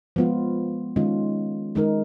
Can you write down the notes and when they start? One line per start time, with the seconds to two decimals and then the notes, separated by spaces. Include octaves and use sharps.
0.16 F3 G#3 B3 F4
0.96 D#3 G#3 C#4 F4
1.75 D#3 G#3 D#4 A#4